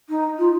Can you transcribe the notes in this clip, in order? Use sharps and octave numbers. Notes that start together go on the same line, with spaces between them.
D#4
F4